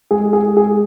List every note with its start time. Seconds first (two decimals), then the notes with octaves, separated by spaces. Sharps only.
0.11 G#3 G#4
0.33 G#4
0.57 G#4